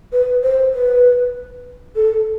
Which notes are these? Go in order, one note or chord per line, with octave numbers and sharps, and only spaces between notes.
B4
C5
B4
A4